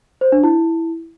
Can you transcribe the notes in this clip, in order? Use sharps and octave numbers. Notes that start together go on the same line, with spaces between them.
C5
D4
E4